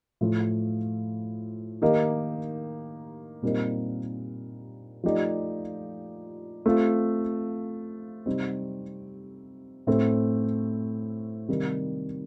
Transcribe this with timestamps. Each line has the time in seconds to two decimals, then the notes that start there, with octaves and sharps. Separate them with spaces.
0.21 A2 F3 A3
1.82 D#3 A#3 D#4 G4
3.42 A#2 G3 C4 D#4 A#4
5.03 F3 A3 D#4 G4 D5
6.66 A3 C4 F4
8.26 C3 G3 C4 D#4
9.87 A2 A3 C4
11.49 C3 D#3 G3